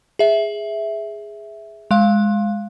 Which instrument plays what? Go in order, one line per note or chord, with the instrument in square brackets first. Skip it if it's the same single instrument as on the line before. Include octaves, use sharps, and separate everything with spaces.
[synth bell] G#4 E5
G#3 F5